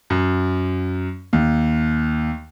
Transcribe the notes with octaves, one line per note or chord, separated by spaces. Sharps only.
F#2
D#2